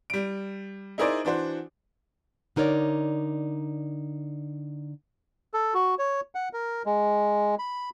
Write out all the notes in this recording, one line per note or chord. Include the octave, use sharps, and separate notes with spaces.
G3 D7
D#4 E4 G#4 A#4 C5 D5
E3 D4 F#4 C5
D3 D#4 A#4 C#5 D5
A4
F#4
C#5
F#5
A#4
G#3
B5